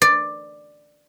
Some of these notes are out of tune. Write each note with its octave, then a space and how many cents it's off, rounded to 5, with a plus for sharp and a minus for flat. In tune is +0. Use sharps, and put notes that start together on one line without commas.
D5 +10